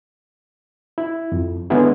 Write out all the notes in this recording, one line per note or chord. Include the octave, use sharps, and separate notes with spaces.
E4
F2
D3 G#3 B3 C#4 E4